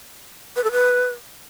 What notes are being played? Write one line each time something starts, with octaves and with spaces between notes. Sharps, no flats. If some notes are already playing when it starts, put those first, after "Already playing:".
B4
A4
B4